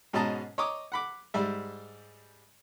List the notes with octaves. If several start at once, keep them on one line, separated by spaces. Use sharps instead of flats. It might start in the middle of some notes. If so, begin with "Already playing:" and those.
G#2 B2 C#4 D#5 A5 A#5
C#5 D#5 A#5 D6 D#6
F#5 B5 D6
G#2 G3 E5